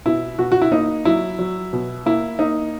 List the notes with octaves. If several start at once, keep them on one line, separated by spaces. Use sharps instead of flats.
B2 E4
B2 F#4
F#4
E4
A#3 D#4
F#3 E4
F#3
B2
A#3 E4
A#3 D#4